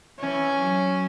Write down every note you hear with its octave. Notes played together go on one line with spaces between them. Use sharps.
E3 C#4
F#3